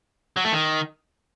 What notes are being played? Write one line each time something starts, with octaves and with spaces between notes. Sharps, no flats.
F#3
A3
D#3